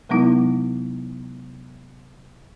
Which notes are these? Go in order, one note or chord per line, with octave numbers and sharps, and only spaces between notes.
C3 F#3 G#3 B3 D#4 E4